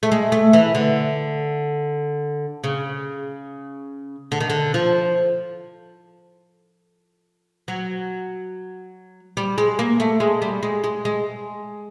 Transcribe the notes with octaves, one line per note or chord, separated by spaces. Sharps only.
A3
G#3
A3
E3
D3
C#3
D3
D#3
D3
F3
F#3
G3
G#3
A#3
A3
G#3
G3
G#3
G#3
G#3